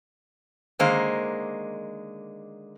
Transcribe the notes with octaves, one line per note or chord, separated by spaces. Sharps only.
D3 D#3 G#3 A#3 C5